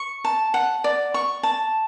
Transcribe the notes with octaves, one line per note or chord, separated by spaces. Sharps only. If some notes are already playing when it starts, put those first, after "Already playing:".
Already playing: C#6
A5
F#5
D5
C#6
A5